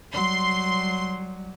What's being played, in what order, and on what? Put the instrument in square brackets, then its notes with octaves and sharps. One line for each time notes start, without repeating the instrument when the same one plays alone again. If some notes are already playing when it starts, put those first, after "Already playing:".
[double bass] F#3 G3 [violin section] C6